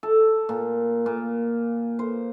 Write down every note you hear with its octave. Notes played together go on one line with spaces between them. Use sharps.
A4
A#2
A#2
C5